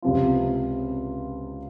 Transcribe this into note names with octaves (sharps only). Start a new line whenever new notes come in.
C#2 C3 F3 C4 F4